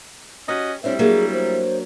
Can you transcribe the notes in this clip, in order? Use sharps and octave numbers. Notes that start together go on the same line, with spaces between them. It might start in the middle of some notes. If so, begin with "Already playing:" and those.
C#4 F#4 G4 D#5
G3 A3 C4 D4 E4 G4 C#5
F#3 A#3 D4 G#4
C5